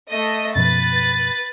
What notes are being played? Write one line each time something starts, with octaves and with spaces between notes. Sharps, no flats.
A3 D#5
F#2 B2 F3 B4 A6